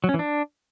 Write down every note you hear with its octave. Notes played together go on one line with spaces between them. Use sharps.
F#3
C#4
E3
D4